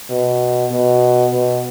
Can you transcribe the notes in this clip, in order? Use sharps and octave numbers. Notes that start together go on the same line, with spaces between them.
B2
B2
B2